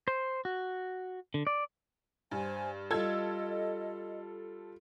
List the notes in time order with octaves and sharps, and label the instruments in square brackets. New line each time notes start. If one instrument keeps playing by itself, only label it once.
[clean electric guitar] C5
F#4
D3
D5
[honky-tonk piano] G2 [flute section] C5 G#5
[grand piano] G3 F4 [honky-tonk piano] A4 E6 G#6 [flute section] D#5